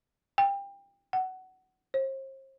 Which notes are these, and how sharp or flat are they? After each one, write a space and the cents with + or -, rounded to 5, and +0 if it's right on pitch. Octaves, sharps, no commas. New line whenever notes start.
G5 +25
F#5 +20
C5 +40